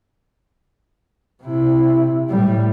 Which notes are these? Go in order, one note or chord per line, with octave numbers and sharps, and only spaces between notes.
C3 E4
A2 G3